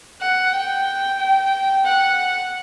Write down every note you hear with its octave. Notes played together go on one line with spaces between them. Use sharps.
F#5
G5
G5
F#5